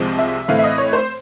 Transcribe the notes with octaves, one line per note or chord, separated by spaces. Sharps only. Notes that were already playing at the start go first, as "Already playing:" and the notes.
Already playing: C2 C3 F3 G#3 C4
E5
A2 E3 A3 C4 F5
E5
D#5
C#5
C5